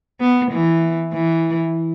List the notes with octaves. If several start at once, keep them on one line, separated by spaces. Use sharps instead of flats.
B3
E3
E3